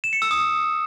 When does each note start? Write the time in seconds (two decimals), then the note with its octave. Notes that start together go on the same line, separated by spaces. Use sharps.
0.04 E7
0.13 C#7
0.22 E6
0.31 D#6